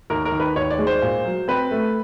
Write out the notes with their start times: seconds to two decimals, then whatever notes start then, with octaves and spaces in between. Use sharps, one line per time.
0.10 D#2 A#4
0.25 A#4
0.32 D#3
0.40 B4
0.56 D#2 C#5
0.71 D5
0.79 G#3
0.87 C5
1.02 A#2
1.25 F#3
1.48 C4 B4
1.71 A3